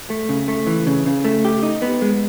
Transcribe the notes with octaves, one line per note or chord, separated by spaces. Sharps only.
A3
C#3
A3
E3
C#3
C#3
A3
G4
D#4
B3
G#3